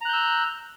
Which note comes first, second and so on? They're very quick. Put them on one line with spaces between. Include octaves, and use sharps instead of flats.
A#5 F#6 G6 E6